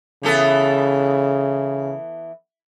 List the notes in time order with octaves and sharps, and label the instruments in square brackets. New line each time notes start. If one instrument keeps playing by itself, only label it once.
[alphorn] C#3 [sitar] E3 B3 A4